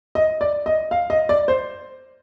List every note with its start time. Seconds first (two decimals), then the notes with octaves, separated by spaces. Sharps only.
0.15 D#5
0.41 D5
0.66 D#5
0.91 F5
1.10 D#5
1.29 D5
1.48 C5